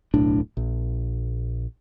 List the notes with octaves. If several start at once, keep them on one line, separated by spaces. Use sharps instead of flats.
D1 B1 A2 D4
A#1